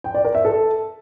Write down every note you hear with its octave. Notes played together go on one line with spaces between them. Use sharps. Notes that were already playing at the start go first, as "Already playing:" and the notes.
G5
D5
A#4
E5
A4